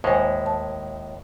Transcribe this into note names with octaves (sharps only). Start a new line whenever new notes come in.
D#2 A2 G#3 C5 G#5
A5